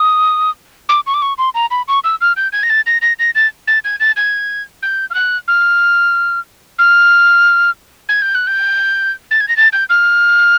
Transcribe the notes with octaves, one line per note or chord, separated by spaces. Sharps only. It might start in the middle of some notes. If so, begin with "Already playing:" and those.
Already playing: D#6
D6
C#6
D6
C#6
C6
A#5
B5
C#6
E6
F6
G6
G#6
A#6
A6
A#6
A#6
A#6
A6
A6
G#6
A6
G#6
G6
F6
F#6
F6
F6
G#6
G6
F#6
G6
A6
G#6
A#6
A6
G6
F6